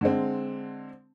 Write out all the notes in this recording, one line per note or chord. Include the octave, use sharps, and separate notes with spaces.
D3 G#3 C4